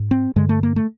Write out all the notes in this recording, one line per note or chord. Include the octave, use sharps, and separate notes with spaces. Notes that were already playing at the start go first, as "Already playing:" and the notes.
Already playing: G#2
C4
G2 D3 G#3
A3
A#3
A3